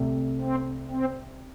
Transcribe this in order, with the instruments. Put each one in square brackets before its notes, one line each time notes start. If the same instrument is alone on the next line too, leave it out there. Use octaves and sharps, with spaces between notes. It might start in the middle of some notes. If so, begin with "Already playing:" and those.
Already playing: [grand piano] C2 C3 A3
[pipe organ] C4
C4